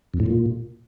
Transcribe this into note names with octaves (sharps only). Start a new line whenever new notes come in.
F2
A2
A#2